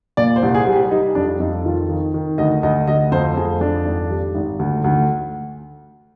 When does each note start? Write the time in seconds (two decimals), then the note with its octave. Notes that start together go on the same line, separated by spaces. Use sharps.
0.17 A#2 D5
0.36 C5
0.42 C2
0.55 G#4
0.67 G3
0.73 G4
0.91 G3 D#4
1.15 F2 D4
1.40 F2 D#4
1.65 D#3 F4
1.89 D#3
2.14 D#3
2.38 D2 D#5
2.63 D2 D#5
2.87 D2 D#5
3.12 F2 C5
3.37 F2 G#4
3.61 F2 D4
3.85 G#1
4.10 G3
4.35 G#1
4.59 D2
4.84 D2